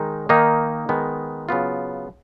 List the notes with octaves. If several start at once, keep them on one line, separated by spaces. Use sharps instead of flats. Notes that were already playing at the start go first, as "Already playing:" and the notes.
Already playing: D#3 G#3 D#4
D#3 A#3 D#4
D#3 G#3 B3
C#3 F#3 B3 F4